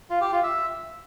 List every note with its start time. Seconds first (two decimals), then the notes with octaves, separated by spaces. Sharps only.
0.10 F4
0.21 G4
0.32 F4
0.43 E5